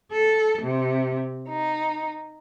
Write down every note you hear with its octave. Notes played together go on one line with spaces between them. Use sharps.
A4
C3
D#4